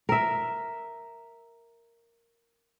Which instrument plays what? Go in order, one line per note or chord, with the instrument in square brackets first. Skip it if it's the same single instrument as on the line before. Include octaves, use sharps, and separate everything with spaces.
[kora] A#4 E5